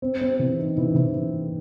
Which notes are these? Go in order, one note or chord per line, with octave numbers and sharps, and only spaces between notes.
C4
C4
E3
D#4
E3
E3